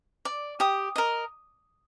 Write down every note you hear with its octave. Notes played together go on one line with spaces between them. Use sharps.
D5
G4 D#6
A#4 D#5